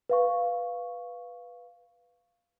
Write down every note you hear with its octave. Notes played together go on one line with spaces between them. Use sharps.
B4 F5 C#6